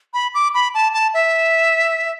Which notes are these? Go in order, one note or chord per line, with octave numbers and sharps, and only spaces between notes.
B5
D6
B5
A5
A5
E5